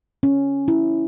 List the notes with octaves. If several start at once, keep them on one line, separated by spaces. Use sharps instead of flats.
C#4
E4